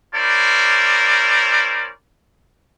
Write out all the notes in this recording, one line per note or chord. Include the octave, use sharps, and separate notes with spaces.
C#4 E4 A#4 C5 D5